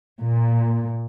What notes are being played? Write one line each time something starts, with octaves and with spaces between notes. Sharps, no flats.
A#2